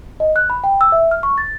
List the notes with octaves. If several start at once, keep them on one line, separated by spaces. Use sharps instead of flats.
D#5
F#6
B5
G5
E6
E5
F6
C#6
A6